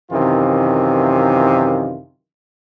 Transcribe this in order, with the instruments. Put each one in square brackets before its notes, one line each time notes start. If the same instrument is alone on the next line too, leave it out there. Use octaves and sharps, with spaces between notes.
[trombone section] F#2 C3 D#3 E3 F4